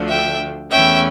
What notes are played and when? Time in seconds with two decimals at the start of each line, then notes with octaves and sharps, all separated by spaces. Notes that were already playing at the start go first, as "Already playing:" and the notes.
Already playing: D2 D3 F3 A3 D4
0.08 E5 G5
0.70 E2 E3 A3 C#4 E5 G5